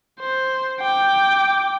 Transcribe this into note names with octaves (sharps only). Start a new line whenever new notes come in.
C5
G5 D6